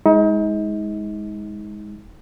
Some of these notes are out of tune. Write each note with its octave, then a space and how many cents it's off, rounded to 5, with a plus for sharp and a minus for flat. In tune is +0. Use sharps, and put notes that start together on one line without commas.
G#3 +0 D#4 +35